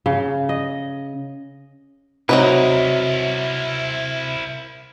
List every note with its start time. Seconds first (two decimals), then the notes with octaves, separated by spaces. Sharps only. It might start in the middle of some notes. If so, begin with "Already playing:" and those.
0.06 C#3
0.49 D#5
2.29 C3 F#3 D#4 E4 F#4 A#4 B4